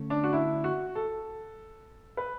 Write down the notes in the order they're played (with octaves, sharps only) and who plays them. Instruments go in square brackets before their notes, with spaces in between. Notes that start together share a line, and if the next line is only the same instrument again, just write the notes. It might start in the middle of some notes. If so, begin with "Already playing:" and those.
Already playing: [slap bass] D3 A3 C#4
[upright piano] D4
F#4
E4
F#4
A4
B4